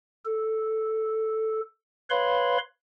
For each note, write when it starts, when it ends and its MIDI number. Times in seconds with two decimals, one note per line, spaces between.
0.25 1.60 69
2.10 2.58 71
2.10 2.58 73
2.10 2.58 77
2.10 2.58 83
2.10 2.58 84